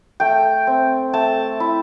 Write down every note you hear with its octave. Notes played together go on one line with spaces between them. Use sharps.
A3 G5
C4
A3 A5
E4